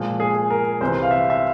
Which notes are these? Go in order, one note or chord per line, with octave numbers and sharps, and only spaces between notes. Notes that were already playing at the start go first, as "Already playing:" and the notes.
Already playing: A#2 F3 G#3
G#4
A#4
C2 C3 E3 C5
F5
E5
E5